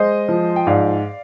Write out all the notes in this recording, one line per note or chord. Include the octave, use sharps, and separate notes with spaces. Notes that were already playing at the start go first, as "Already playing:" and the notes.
Already playing: G#3 C5 D#5
F3
G5
G#2 D5 F5